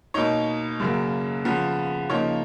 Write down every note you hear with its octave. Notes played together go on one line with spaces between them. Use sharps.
B2 A#3 D#4 C#5
F#2 C#3 F#3 A#3
C#3 F3 B3
C#3 F3 A#3 D#4 C#5